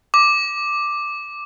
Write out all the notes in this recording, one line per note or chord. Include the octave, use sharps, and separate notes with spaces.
D6